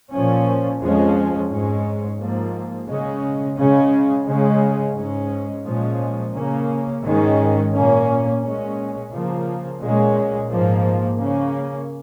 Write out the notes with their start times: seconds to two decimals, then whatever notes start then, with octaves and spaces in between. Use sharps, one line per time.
0.10 A#2 F3 C#4
0.80 F2 F3 G#3 C#4
1.49 G#2 G#3 C#4
2.19 G#2 F3 A#3
2.87 C#3 G#3 C#4
3.56 C#3 G#3 C#4
4.26 C#3 G#3 C#4
4.95 G#2 G#3 C#4
5.64 A#2 F3 G#3 C#4
6.33 C#3 A#3 C#4
7.03 G#2 D#3 G#3 C#4
7.72 A#2 A#3 C#4
8.42 A#2 G#3 C#4
9.10 C#3 F3 A#3
9.80 A#2 G#3 C#4
10.49 G#2 F3 A#3
11.19 C#3 A#3 C#4